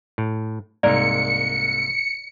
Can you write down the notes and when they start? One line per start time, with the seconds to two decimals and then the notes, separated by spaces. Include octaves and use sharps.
0.18 A2
0.83 C2 G#2 A#3 A#4 D5 C#7